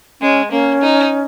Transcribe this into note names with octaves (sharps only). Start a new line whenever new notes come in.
G#3 C#4
A#3 C#4
D#4